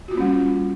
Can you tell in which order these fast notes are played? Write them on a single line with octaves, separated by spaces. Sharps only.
F#4 F4 A#3 C#4 G3